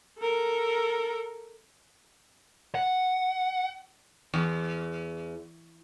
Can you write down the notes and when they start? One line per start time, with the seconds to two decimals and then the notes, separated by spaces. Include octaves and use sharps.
0.18 A4 A#4
2.75 F#5
4.34 E2